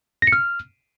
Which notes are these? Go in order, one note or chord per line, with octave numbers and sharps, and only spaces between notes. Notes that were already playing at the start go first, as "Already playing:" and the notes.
A#6
C#7
F6